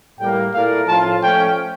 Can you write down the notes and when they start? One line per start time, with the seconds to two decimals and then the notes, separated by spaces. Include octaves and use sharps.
0.20 A2 G3 A#3 G5
0.54 A#2 A3 E4 A#4 D5 F5
0.88 A2 F3 C#4 F4 A5
1.22 F3 A3 C#4 G5